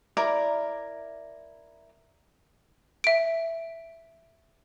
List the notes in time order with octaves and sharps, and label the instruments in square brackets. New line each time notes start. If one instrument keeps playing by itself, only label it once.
[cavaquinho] E4 A#4 D5 A#5
[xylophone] E5 D7